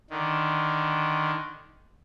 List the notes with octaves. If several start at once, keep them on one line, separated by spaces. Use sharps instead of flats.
D3 D#3